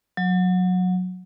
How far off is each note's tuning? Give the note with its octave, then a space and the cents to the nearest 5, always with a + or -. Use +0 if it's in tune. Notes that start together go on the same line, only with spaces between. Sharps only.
F#3 -20